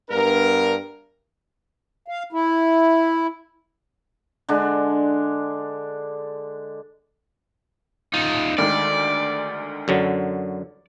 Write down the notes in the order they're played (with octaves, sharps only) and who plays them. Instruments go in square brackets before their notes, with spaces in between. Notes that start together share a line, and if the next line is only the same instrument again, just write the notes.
[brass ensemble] G2 B3 D4 A#4
[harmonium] F5
E4
[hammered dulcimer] D3 G#3 D4
[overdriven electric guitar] D#4 F4
[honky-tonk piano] D2 D#3 G#3 [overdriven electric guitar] D5
[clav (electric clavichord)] F#2 D3 F#3